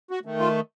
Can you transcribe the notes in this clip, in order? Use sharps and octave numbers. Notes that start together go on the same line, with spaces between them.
F#4
D#3 A3
F4